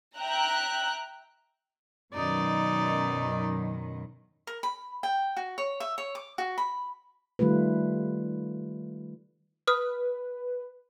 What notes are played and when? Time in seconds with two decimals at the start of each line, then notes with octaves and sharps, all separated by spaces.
0.18 E5 G5 A#5 F#6
2.13 F#2 B2 D#3 D#4 D5
4.47 A#4
4.63 B5
5.03 G5
5.37 F#4
5.58 C#5
5.80 E5
5.98 C#5
6.15 D6
6.38 F#4
6.58 B5
7.39 D#3 G3 A3 F4 B4
9.67 B4 D#6 F6